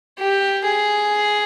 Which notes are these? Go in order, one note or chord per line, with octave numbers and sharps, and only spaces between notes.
G4
G#4